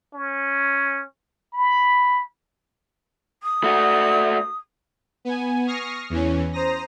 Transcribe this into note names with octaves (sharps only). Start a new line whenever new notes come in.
C#4
B5
D#6
A3 F#4
B3 G#5
C#6 D#6 F6 A#6 C7
E2 E3 C#4
C5 A#5 D#6 A#6